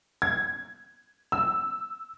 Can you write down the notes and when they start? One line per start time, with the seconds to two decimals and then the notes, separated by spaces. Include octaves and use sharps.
0.22 G#6
1.32 E6